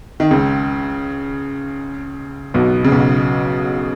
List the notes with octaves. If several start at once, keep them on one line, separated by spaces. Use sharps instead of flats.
D#3
C#2 C#3
B1 B2
C#3
B1 B2